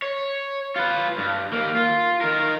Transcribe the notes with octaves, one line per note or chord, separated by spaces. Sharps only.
C#5
F4 B4
G2
D#2 A#3
F4
D#3 A#4